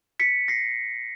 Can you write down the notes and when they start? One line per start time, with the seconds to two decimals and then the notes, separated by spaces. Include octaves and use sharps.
0.20 B6 C#7
0.48 A#6 C7